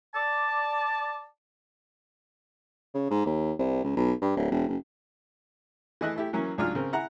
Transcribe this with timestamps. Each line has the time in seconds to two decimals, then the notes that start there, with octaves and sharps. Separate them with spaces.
0.14 D5 A5
2.94 C#3
3.10 G#2
3.26 D#2
3.59 C2
3.84 C#2
3.97 B1
4.22 G2
4.36 D1
4.52 E1
4.68 F#1
6.01 E3 A3 E4 D#5 E5 F#6
6.16 A3 E4 G4
6.33 E3 F#3 A#3 C#4
6.58 C#2 F#3 D4 D#4 F4 F6
6.75 C#3 C4 A#4
6.93 E4 F#5 A#5 F#6